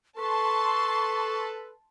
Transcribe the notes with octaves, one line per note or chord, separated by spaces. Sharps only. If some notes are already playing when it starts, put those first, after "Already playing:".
A4 B4 A5 C6 C#6